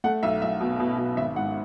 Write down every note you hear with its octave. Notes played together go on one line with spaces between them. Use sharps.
A3 F#5
B1 E5
B1 E5
B2
B2
B2
G#1 E5
G#2 F#5